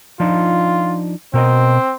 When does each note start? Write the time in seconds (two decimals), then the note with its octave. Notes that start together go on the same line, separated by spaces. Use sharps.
0.20 F3 D4 D#4 F4
1.34 B2 C4 A#4 D#5